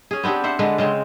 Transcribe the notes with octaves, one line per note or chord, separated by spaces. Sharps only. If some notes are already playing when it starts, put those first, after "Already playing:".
C#4 G#4
B3 C4 D4 G4
C5 E5 F#5
D3 G#3 D4 B4
C#3 G#3 C4